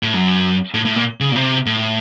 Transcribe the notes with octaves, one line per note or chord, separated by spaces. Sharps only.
A2
F#2
A2
A2
A#2
C#3
A#2
C3
A2